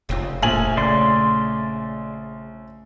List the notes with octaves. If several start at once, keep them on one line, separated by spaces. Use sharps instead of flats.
F1 C#3 C4 F4
A#1 A3 G#5 F#7
C#3 D5 C6